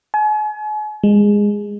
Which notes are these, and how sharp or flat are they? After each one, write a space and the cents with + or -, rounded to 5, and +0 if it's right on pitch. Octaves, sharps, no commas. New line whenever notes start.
G#5 +40
G#3 -15